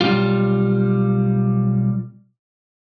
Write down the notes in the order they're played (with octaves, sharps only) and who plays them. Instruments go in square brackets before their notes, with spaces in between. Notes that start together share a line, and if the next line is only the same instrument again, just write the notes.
[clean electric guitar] B1 G3 F4